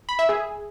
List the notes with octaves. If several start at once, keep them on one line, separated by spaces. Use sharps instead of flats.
B5
E5
G#4